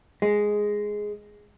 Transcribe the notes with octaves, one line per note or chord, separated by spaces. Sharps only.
G#3